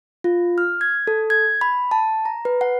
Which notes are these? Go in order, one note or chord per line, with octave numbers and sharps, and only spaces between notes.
F4
F6
G#6
A4
G#6
B5
A5
A#5
B4
F#5